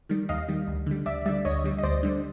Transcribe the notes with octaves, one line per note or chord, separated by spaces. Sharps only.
D#3 G3
D#2 D#5 F5
D#3 G3
D2
D3 G3
D2 D5 E5
D3 G3 D5 E5
D2 C#5 D#5
D3 G3
D#5
D2 C5 D5
D3 G3